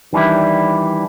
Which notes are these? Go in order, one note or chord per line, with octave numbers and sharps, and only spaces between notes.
D#3 E3 G3 D4 E4